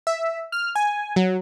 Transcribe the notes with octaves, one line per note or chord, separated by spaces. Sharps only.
E5
F6
G#5
F#3